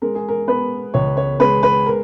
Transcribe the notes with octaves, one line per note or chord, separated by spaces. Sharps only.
G#3 A#4
G#4
A#4
B3 B4
C#2 C#5
C#5
G#3 B4
B4
A#4